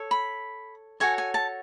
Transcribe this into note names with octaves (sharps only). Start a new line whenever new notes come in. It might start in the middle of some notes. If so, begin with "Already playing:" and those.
Already playing: A4 C#5
B5
F#4 A4 C#5 G#5
G#5
A5